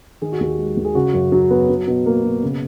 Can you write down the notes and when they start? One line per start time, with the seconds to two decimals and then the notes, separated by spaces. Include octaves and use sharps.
0.22 D#3 G#4
0.32 F#4
0.40 D#2 G#4
0.58 G#3
0.77 D#2
0.85 G#4
0.95 C#3 F#4
1.14 F#2
1.32 F#3
1.51 B3
1.69 F#3
1.88 B2
2.06 A#3
2.24 B2
2.43 C#3